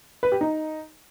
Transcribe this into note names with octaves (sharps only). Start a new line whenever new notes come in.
B4
G4
D#4